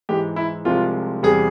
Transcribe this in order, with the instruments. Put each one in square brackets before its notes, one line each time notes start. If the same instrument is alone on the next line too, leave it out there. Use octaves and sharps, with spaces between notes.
[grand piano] G#2 E3 G#3 G4
E4
C2 C3 F3 G#3 F4
E2 C3 G3 G#4